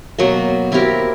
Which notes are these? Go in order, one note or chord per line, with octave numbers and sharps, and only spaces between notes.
B2 F#3 A#3
C4 E4 G4 A#4